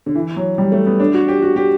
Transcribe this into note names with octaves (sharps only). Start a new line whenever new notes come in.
D3
E3
F#3
G3
A3
B3
D4
F#4
G4
F#4
G4